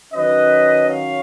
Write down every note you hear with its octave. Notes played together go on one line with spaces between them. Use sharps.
D#3 F#3 C#4 B4 D#5
C#5 F5